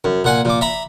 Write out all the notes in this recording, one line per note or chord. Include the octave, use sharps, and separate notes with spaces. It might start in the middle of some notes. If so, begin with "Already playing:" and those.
F#2
A#2 F#5 G#5
A#2 D6
E5 A#5 B5